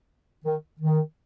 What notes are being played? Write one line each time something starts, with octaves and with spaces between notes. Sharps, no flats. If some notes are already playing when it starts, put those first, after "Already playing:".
D#3
D#3